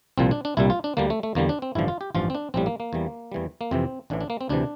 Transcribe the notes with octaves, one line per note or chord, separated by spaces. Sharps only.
C2 A#2 F3 C4
D4
D4
C2 A#2 G3 E4
F4
D4
D2 D3 G3 A#3
A3
A3
E2 D3 G3 A#3
D4
C4
A1 G2 D3 F3 E4
F4
G4
A1 G2 F3 F4
C4
D4
A#1 A2 G3 C4
A#3
A#3
E2 E3 G3
E2 E3 G3
A#3
F2 C3 E3 C4
A1 A2 E3 D4
D4
A#3
C4
D2 C3 E3 D4